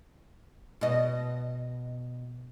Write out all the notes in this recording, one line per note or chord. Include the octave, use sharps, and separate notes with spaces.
B2 D#5